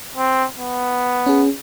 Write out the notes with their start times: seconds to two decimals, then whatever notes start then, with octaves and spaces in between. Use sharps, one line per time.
0.16 C4
0.57 B3
1.26 C#4 G#4